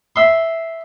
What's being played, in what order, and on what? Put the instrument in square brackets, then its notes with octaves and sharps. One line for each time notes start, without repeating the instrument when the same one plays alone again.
[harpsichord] E5 C6